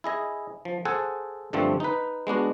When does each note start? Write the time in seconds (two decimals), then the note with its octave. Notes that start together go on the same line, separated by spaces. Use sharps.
0.04 E4 G#4 D#5
0.65 F3
0.85 G#4 A4 C5 F#5 G#5
1.53 G2 D3 F3 A3 C4
1.80 D#4 B4
2.27 G#3 B3 D4 F#4